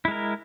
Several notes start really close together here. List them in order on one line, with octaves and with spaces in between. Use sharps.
E4 G#3 A#4